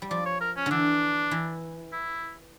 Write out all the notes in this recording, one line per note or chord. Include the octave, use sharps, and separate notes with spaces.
G3
F3 D5
C#5
A#4
C#4
D3 E3 D4
E3
E4